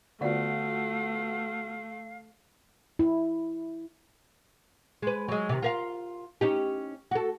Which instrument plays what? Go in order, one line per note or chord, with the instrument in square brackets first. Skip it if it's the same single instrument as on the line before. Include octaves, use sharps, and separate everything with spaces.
[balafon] D3 D5 [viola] A3 [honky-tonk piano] B3 F4 F#4 [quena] F5
[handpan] E4
[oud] G#3 B4
F#3 G#3
C3 D#3
F4 A#4 F5
C#4 D#4 G4
F#4 A4